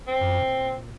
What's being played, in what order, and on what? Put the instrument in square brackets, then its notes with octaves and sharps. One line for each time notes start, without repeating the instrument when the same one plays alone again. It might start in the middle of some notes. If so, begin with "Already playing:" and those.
[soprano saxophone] C4
[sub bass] F#2
A#2